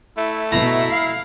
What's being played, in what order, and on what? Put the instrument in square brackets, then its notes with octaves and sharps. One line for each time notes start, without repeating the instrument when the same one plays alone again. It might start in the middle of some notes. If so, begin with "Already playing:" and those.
[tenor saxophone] A3 [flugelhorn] E4
[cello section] B2 [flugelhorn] E4 [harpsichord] A#5 B5
[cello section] F5